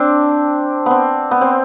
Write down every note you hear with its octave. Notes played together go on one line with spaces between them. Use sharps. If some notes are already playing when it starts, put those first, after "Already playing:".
Already playing: C4 D4
B3 C4
B3
C4